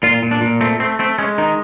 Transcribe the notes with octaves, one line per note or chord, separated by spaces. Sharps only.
A#2 F4
A#2
D4
A#2
A3 C4
A3 C4
A3 C4
G#3 C#4
D#3 D#4